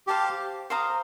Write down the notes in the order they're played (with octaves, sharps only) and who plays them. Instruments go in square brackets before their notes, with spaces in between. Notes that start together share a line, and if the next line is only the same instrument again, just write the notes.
[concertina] G4 [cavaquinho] C5 F5 A5 D6
[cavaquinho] C5 F5 A#5 D#6